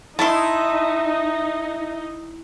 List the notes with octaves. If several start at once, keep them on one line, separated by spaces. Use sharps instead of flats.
D#4 E4 E5 A5 C6